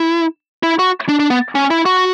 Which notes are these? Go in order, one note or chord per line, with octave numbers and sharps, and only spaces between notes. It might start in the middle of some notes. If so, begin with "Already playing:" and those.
Already playing: E4
E4
F#4
D4
D4
B3
C#4
E4
F#4